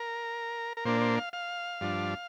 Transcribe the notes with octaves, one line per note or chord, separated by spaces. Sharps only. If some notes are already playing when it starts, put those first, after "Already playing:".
Already playing: A#4
A#4
A#2 A#3 D4 C5
C5
F5
F5
G2 F3 D4